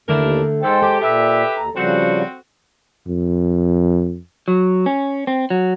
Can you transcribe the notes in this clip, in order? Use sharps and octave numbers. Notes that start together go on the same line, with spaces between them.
D#2 D3 A3 D4 E4 A#4
G#2 G#3 A4 C5 G5
G4 A4
A#2 G4 B4 E5
D#2 A#5
C#3 F3 G3 C4 F#4
F2
F#3
C#4
C4
F#3